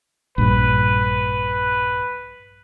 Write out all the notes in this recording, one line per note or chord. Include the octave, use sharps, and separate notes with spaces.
A#1 G2 B4